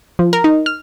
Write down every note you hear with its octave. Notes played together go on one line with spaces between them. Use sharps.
F3
A#4
D#4
F6